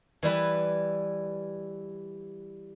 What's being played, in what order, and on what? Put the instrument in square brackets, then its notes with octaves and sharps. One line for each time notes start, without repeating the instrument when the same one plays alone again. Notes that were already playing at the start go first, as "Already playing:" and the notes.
[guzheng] E3 G3 E4 B4